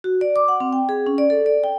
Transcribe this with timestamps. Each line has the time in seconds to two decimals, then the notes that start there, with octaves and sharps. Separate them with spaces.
0.04 F#4
0.21 D5
0.36 D6
0.48 F#5
0.60 C4
0.73 G5
0.89 G#4
1.07 C#4
1.18 D5
1.30 A4
1.46 D5
1.64 G5